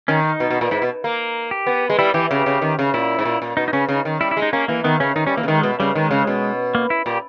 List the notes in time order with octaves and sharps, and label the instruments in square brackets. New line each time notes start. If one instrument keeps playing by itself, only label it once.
[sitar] D#3 [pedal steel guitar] C#4
[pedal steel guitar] D#4
[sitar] B2
B2
A#2
[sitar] G#2 [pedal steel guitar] E4
[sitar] B2
A#3
[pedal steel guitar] G4
[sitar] B3
G#3
[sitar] G3 [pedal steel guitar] E4
[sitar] E3 [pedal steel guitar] G4
[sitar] C#3 [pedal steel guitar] G4
[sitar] C#3
D#3
C#3
[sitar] A#2 [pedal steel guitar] E4
[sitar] G#2
A#2
A#2
[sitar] B2 [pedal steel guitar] D#4
[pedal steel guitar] D#4
[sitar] C#3 [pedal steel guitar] C#4
[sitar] C#3 [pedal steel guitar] D#4
[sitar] D#3
[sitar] G3 [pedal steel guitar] E4
[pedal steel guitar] E4
[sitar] G#3
[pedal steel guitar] D#4
[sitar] A#3 [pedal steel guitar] C#4
[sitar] E3 [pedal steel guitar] A#3
[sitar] D#3 [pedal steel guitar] B3
[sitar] C#3 [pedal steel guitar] C#4
[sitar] D#3 [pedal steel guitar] D#4
[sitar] G3 [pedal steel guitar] C#4
[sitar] E3 [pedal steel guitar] A#3
[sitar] C#3
[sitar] D#3 [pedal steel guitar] G#3
[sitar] B2
[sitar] C#3 [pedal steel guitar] G3
[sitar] D#3 [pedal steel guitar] G#3
[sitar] C#3
B2
[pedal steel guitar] A#3
E4
[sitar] A#2 [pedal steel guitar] G4